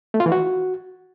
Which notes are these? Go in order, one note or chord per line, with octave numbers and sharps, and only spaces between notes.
A3
F4
E3
F#4